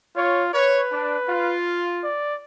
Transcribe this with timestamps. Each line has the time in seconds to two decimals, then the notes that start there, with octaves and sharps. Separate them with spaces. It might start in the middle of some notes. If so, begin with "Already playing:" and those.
0.16 F4 C#5
0.54 B4 C#5
0.91 D4
1.28 F4
2.03 D5